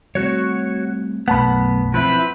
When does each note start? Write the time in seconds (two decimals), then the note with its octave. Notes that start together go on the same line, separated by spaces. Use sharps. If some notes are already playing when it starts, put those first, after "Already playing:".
0.15 G3 A3 C4 F#4 C#5
1.28 B1 F#2 A3 B3 F#5 A5 B5
1.94 F3 C4 E4 B4